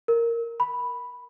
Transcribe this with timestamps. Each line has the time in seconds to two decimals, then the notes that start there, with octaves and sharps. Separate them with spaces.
0.08 A#4
0.60 B5